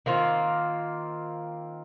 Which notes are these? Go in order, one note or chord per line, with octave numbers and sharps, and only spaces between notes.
D#3 A#3 C4 F4